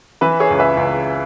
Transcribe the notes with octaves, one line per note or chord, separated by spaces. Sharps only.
E3 B4 E5
G#4 C#5
C#2
B4 E5
C#2